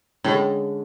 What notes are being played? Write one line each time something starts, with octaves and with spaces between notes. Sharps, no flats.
A2 D3 G#3 C#4